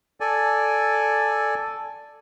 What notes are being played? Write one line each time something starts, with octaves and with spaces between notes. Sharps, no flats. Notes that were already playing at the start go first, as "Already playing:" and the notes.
A4 D5 G#5